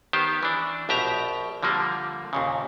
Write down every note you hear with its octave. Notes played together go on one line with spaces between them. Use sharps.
D#3 B3 G4 C5
E3 D4
A#1 B2 G4 E5 A#5
D3 F3 G3 A#3
D#2 A#2 C#3